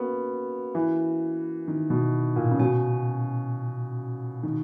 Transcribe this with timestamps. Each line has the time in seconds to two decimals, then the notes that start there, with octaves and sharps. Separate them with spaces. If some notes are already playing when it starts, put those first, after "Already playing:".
Already playing: A#3 B3 C#4 F#4 A#4
0.75 E3
1.68 D#3
1.90 B2
2.36 A#2
2.51 C#3
2.59 B2 C#4 F#4 C#5 G#5
4.43 D#3